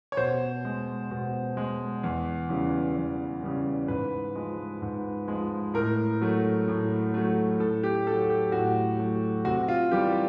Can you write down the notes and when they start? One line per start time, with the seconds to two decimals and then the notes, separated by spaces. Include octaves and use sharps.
0.12 C#5
0.17 B2 C5
0.65 G#3
1.11 B2
1.57 G#3
2.03 E2
2.49 C#3 E3 G3
2.96 E2
3.43 C#3 E3 G3
3.88 G#2 B4
4.35 F3 G#3
4.82 G#2
5.28 F3 G#3
5.74 A2 A#4
6.21 F#3 A3
6.68 A2
7.14 F#3 A3
7.59 A2 A4
7.83 G4
8.07 A3 A4
8.10 F#3
8.30 G4
8.52 A2 F#4
8.99 F#3 A3
9.45 C3 F#4
9.68 F4
9.91 E3 G3 G4